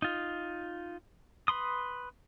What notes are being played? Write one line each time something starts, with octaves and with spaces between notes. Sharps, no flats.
D#4 F4
B4 B5 C6 D#6